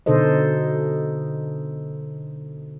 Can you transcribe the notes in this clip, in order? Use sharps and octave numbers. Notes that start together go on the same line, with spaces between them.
B2 D3 D#4 A4 C5 D#5